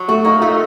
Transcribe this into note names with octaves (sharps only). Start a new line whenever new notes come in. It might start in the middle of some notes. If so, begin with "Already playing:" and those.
Already playing: F#3
A3 F#4
A#3 D#4
A3 F4